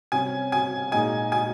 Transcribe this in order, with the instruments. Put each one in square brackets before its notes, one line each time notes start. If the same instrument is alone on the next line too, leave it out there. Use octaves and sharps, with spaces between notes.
[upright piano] C3 G3 C#4 [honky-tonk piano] G#5
[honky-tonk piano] G#5
[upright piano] A#2 G#3 D#4 [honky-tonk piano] G#5
[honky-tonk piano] G#5